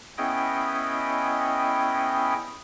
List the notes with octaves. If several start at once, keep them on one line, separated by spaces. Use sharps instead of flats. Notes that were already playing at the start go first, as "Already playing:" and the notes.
B3 C#4 E4 G#4 D#5 G5